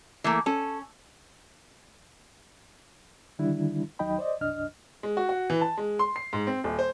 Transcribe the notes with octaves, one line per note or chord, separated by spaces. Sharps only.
E3 A3 A#3
C#4 A4
D3 D#3 G3 D4 E4
D#2 F#3 D#4 D#5 G5 B5
C5 D5 D#5
C2 F#2 D4 D#5 F6
G#3
F#4
F#4
E3
A5
G#3
C6
C7
G#2
C4
D#1
C5